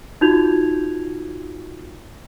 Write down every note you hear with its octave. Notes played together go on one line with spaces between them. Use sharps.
D#4 F4 F#4 G6 G#6 F7